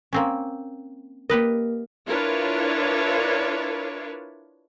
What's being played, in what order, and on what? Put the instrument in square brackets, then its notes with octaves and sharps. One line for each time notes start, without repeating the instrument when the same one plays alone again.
[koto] A#3 C4 C#4
[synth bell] A#3 A#4 [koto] G4 B4 D#5
[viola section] D4 E4 F4 A#4 B4 C#5